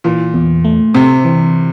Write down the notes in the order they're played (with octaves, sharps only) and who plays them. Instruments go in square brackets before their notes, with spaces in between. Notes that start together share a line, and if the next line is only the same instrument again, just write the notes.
[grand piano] A#2 [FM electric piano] E3
[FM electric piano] E2
A3
[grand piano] C3 [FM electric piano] C4
[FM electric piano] E3